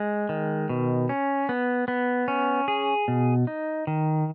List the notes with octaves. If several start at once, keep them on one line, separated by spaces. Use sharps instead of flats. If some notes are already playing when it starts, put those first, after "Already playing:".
Already playing: G#3
D#3
B2
C#4
B3
B3
C#4
G#4
B2
D#4
D#3